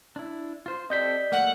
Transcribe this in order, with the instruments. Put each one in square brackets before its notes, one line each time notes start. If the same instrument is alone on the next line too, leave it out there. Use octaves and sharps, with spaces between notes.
[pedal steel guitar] D4 E4
F4 C5
[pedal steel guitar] C4 G4 A4 [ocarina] D5 [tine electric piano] D#5 G6 B6
[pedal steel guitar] F#3 A3 A#3 [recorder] F#5